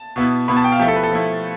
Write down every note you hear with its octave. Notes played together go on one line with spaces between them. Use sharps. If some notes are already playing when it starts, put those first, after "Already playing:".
Already playing: A5
B2 B3 E4
B2 B3 E4 B5
A5
G5
F5
F3 A3 E4 G4
A4
B4
A4
F3 A3 E4